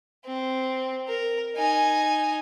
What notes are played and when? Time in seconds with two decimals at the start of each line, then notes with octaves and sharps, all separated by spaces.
0.25 C4
1.08 A#4
1.56 D#4 G#5